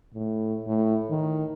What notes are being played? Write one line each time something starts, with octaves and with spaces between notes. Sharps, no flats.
A2
A2
D#3